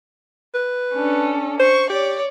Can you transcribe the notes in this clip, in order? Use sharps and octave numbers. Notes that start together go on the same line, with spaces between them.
B4
C#4 D4 A4
C5 C#6
G4 C#5 D5